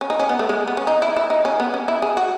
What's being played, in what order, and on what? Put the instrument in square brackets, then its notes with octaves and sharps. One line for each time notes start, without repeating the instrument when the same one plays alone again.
[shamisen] C#4
D#4
C#4
B3
A3
G#3
B3
C#4
D#4
E4
E4
D#4
C#4
B3
C#4
E4
G#4
F#4